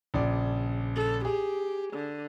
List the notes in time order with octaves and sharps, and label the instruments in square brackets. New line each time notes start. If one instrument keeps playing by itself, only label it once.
[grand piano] A#1 C#3 D5
[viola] A4
[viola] G4 [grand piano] G#4
[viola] D3